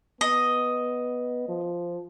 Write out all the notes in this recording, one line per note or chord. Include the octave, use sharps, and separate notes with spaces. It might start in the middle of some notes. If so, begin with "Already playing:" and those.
B3 D#5
F3